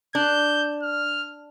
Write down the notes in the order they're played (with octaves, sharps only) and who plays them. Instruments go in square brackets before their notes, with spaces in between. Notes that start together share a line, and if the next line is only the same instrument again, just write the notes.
[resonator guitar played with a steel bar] D4 [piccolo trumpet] G6
[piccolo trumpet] F6